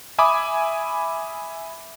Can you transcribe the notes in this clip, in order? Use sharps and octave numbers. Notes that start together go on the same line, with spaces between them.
E5 G#5 B5 D6 D#6